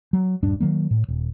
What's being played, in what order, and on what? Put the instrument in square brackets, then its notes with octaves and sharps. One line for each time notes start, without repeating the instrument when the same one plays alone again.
[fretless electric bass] F#3
D#1 G2 D4
D#3 E3 F#3 A#3
A2
D#1